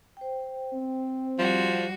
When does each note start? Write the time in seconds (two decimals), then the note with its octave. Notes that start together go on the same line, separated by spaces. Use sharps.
0.17 C5 G5
0.74 C4
1.39 F3 G3 F#4 C6